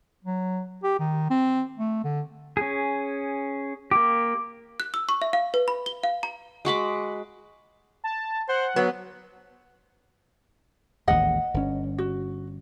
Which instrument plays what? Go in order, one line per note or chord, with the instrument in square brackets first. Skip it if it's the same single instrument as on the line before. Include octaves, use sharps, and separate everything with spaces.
[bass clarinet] F#3
G4
D#3
C4
A3
D3
[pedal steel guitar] C#4 G#4
[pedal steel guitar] A#3 G4 [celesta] D6
[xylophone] F#6
E6
C#6
E5
F5
B4
B5
G7
F5
A#5
[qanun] G#3 F#4 B5 D6
[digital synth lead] A5
[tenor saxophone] C5 [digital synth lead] F#5
[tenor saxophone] F#3 [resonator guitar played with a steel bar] B3
[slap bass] A1 D#2 G#2 [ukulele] D#5 F#5
[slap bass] G1 C#4
[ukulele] F#4